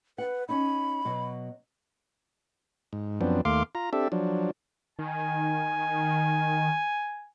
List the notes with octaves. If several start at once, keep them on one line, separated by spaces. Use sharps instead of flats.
B4 F#5
C#4 D#4 B5
B2 F#3
G#2
F#2 F3 B3 C4 D4
D#2 A3 F5 C6 D6
F4 A#5
C4 D4 G4 A4 E5
F3 F#3 D4
D#3 G#5